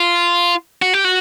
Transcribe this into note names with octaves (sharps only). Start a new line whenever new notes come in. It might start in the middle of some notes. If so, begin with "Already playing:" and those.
Already playing: F4
F#4
G4
F#4